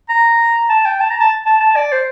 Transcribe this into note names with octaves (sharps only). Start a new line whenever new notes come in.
A#5
A5
G5
A5
A#5
A5
A5
A5
D5
C5